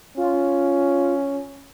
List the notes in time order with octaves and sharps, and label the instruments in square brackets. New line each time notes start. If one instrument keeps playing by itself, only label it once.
[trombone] C#4 [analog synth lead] F4